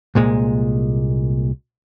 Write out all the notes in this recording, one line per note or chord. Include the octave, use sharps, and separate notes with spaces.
C2 A#2 G#3